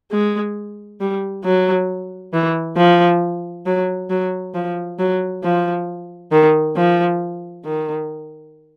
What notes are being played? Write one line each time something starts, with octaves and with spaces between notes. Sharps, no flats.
G#3
G3
F#3
E3
F3
F#3
F#3
F3
F#3
F3
D#3
F3
D#3